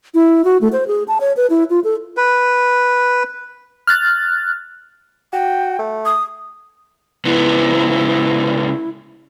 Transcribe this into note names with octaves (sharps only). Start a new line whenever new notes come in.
E4
F#4
A3
C5
G#4
A5
C#5
B4
E4
F4
A4
B4
F6 F#6 A6
F#4 G5
A3
D#6
C#2 B3 E4